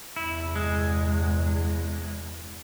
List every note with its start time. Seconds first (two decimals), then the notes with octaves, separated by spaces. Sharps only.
0.16 E2 G2 C3 E4
0.56 G#3